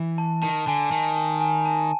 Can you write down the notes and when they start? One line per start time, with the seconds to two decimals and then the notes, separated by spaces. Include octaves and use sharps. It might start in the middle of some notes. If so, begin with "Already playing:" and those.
Already playing: E3
0.18 A5
0.42 D#3 A5
0.67 D3 G#5
0.92 D#3 A5
1.16 A5
1.40 G#5
1.65 A5